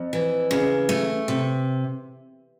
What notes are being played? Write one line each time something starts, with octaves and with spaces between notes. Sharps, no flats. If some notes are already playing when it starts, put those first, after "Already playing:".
Already playing: F2
E3
C#3
A3
C3